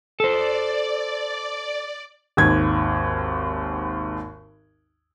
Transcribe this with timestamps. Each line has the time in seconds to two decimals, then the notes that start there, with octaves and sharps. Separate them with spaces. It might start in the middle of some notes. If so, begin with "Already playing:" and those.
0.20 A4 C5 D5
2.37 G#1 D#2 G#6